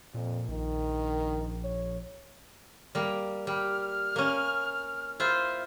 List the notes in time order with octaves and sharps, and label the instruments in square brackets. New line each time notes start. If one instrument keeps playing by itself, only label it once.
[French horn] F2 [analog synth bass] A#2
[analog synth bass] A#1 [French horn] D#3
[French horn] C#5
[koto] G3 A#3
[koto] G3 [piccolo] F6
[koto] A#3 C#4
E4 F4 C5